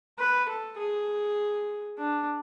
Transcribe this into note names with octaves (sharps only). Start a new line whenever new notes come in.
B4
A4
G#4
D4